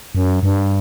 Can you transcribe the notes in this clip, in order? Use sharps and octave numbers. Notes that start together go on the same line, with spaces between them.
F#2
G2